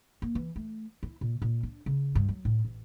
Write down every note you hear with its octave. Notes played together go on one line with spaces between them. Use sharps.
A#3
E3
A3
E4
A#2
A#2
D4
C#3
G2
F#3
A2
A1